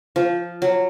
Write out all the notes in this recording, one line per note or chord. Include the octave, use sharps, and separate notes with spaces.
F3
F#3